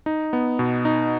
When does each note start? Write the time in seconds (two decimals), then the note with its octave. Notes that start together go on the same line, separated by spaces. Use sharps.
0.06 D#4
0.33 B3
0.59 B2
0.85 D#4